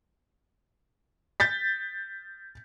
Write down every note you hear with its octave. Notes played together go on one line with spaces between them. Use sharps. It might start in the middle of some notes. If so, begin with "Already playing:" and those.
G6 A6 B6